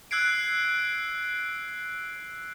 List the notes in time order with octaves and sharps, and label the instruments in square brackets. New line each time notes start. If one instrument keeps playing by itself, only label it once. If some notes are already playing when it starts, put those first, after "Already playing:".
[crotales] E6 F#6 G#6 C7 D7